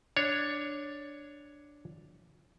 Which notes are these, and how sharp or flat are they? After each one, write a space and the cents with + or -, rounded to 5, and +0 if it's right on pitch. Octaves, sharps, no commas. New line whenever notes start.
D4 +0 C#5 +5